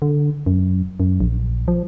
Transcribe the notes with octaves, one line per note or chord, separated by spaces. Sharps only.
D3
F#2
F#2
A#1
F3